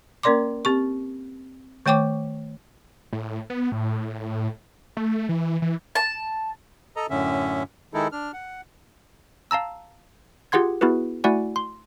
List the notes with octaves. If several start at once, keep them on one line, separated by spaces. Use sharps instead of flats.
A#3 C#4 A#4 D5 C6 D6
C4 G4 C#6
D#3 A3 C#5 G5 C#6 D6
A2
B3
A2
A3
E3
E3
A5
A4 D#5 A#5
F#2 A2 D3 C#4 E5
D#3 G#3 D#4 E4 A4
D4 F6
F#5
F5 A5 A#5 E6
F4 G4 G#4 F#5 C6 G#6
B3 E4 F#4 G#4 B4
A3 E4 F#4 D5 F#5 G#5
C6